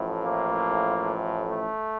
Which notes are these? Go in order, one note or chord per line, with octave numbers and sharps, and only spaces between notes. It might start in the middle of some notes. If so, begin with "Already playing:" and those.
Already playing: A1 A2 F3
A#3
A3